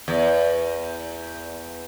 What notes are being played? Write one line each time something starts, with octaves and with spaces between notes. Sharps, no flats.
E2